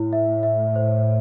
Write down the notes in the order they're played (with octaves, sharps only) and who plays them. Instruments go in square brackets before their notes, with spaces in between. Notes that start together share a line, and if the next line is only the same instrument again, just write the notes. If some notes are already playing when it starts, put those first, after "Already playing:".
Already playing: [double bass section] A2 [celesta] E4
[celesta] E5
E5
C5